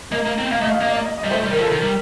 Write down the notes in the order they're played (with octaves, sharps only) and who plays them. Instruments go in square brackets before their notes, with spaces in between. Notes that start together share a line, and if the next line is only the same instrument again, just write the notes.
[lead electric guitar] A#3 [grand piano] D#5
[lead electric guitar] A#3
C4
[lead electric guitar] A#3 [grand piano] F5
[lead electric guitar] A3 [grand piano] D#5
[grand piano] F5
[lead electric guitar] A#3 [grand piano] D#5
[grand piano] D5
D#5
D#5
[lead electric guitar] G3
[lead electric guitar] A3 [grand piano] C5
[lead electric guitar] G3
[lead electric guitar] D#3 [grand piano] A#4
[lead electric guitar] F3
[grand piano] A4
[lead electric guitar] D#3 [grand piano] A#4
[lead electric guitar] G3